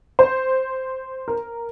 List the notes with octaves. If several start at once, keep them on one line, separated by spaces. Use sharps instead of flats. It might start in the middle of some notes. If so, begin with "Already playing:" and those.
C5
A#4